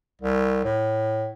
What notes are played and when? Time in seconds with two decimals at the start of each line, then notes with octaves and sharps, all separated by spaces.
0.22 C2
0.64 A2